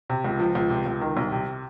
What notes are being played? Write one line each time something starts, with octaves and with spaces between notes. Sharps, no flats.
C3
C#2
F3
C#2
C3
C#2
D#3
C2
C3